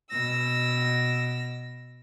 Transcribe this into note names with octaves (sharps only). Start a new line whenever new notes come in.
B2 E6 A#6